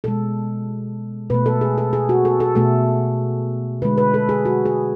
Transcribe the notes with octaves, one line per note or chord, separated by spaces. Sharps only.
B2 G#3 A4
B2 A3 B4
A4
G#4
A4
G#4
F#4
A4
A4
B2 A3 A4
D3 G#3 B4
B4
A4
G#4
F#4
G#4